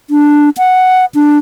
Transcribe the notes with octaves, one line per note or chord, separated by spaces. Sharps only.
D4
F#5
D4